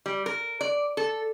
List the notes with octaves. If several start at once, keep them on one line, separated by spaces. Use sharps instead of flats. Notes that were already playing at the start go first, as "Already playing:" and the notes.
G3
A#4
D5
A4